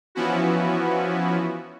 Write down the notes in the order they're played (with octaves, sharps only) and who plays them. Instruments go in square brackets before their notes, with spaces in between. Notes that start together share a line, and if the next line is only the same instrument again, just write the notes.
[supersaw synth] E3 F3 B3 C#4 E4 F#4